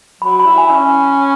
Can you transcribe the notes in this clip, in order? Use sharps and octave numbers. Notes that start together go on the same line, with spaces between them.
F#3 B5
B5
E4
G#5
C#4